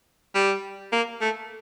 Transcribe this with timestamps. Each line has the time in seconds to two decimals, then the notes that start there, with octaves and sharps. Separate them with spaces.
0.35 G3
0.92 A#3
1.21 A3